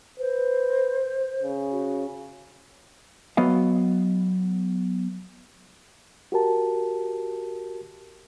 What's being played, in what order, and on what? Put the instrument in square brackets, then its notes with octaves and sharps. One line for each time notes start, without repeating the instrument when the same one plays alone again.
[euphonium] B4 [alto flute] C5
[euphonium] C#3
[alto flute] F#4
[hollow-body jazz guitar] F#3 B3 D#5 F5
[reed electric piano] F#4 G4 A#4 A5